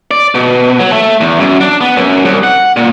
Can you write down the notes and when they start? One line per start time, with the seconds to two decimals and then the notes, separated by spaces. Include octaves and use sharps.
0.11 D5
0.35 B2
0.79 F#3
0.92 A3
1.21 E2
1.40 F#2
1.61 D4
1.81 B3
1.97 F#2
2.25 C2
2.44 F#5
2.77 A#2